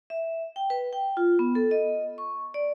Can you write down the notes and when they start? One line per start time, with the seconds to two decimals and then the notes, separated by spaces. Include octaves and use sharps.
0.10 E5
0.56 G5
0.70 B4
0.93 G5
1.17 F4
1.39 B3
1.55 A4
1.71 D#5
2.18 C#6
2.54 D5